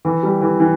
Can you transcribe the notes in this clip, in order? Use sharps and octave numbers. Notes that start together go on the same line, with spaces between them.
E3
G3
E3
E3